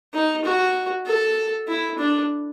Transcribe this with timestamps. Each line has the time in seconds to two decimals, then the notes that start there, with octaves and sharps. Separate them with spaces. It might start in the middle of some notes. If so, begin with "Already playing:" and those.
0.14 D#4
0.45 F#4
1.06 A4
1.68 E4
1.98 D4